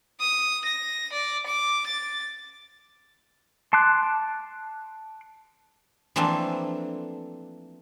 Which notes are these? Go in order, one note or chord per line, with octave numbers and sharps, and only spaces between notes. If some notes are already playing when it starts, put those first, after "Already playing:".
D#6
A#6
D5
D6
A6
A5 C6 D6 F#6
E3 F3 A3 A#3 C4 D4